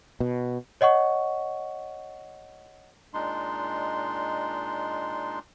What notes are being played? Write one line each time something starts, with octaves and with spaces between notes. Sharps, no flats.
B2
C#5 D#5 F#5 C#6
A#2 G#3 D4 D#4 C6